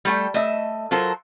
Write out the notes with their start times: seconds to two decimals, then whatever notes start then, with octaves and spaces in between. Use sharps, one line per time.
0.05 G3 A3 G5
0.34 A3 D#5 E5
0.91 F#3 F4 A4 A#4 C5